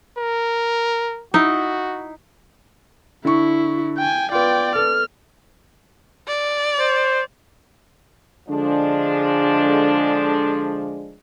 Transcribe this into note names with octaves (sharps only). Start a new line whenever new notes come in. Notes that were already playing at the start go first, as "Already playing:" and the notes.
A#4
D#4 E4 F#4
D3 E4 C#6
G5 G#5
B3 F4 D5 G5
B3 A4 F6
D5
C5
D3 F3 G#3 D4